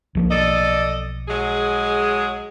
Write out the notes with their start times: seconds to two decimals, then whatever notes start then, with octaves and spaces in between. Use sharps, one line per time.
0.15 B1 F3 A#3
0.29 A4 D5 D#5
1.27 F#3 G#3 G#4